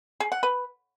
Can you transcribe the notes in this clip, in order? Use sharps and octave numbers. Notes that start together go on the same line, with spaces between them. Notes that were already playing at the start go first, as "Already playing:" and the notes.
G#4
F#5
B4